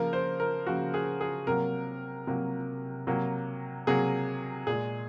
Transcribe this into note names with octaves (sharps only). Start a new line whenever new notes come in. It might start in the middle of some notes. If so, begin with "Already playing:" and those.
Already playing: C#3 F3 A#3 A#4
C5
A#4
C#3 F3 A#3 F#4
G#4
G#4
C3 F#3 A#3 A#4
C3 F#3 A#3
C3 F#3 A#3
C3 F#3 A#3 G#4
A#2 G#3 G#4